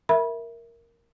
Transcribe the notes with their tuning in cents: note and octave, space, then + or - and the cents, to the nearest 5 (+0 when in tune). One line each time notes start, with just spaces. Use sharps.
A#4 +0 E5 +0 B5 -25